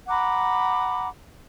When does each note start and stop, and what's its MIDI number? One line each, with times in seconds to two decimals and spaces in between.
0.08 1.08 78
0.08 1.08 82
0.08 1.08 83
0.08 1.08 86